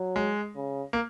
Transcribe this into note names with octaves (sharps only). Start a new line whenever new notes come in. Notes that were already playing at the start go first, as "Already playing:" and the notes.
Already playing: F#3
G#3
C#3
A#3